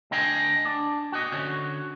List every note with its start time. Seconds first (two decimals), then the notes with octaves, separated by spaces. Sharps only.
0.11 D2 D4 D#5 G5 G#5
0.65 D4
1.12 F#4 D#5
1.32 D3 C#4 F#4